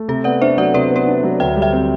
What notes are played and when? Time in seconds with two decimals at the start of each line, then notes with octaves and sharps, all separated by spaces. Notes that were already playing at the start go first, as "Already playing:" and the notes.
Already playing: A3
0.08 C3 A4
0.24 B3 D5 F#5
0.41 D4 C5 E5
0.57 F#3 D5 F#5
0.74 C3 B4 D5
0.90 B3
0.96 B4 D5
1.07 D4
1.23 F#3
1.40 D2 E5 G5
1.56 G3
1.62 E5 G5
1.72 C4